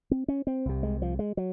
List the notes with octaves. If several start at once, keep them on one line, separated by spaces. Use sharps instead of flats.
C4
C#4
C4
C2 C3
G#3
F3
G#3
F#3